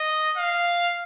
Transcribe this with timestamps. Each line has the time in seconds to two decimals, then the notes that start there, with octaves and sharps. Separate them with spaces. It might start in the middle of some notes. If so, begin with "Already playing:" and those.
Already playing: D#5
0.37 F5